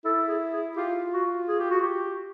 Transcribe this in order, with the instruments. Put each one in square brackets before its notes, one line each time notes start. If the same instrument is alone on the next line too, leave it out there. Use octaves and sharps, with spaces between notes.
[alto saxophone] E4 [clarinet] A4
[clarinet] G#4
G#4
[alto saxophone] F4 [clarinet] G4
[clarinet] F#4
G#4
G4
F#4
G4